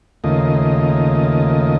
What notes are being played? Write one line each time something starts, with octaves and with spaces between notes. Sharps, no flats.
D#2 C#3 A3 A#3 F4 D#5